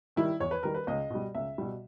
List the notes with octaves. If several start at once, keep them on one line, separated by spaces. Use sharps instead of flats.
D#3 G3 E4
E2 C#5
B4
D#3 G3 A#4
B4
C#2 D#5
B2 G3
C#2 E5
B2 G3